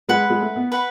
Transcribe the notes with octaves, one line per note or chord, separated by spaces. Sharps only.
G#3 B4 F#5 B5
G#3
A3
B3
B4 F#5 B5